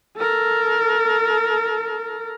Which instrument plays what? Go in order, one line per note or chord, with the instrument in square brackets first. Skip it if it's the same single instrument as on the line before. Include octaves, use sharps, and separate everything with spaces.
[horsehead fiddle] A4 A#4